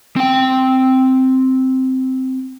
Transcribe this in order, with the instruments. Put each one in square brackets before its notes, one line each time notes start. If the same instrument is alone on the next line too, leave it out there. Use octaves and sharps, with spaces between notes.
[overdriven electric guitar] C4 G5